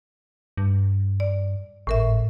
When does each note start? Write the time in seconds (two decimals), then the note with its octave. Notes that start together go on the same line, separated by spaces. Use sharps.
0.57 G2
1.20 D5
1.87 G#1 A2 A#4 E5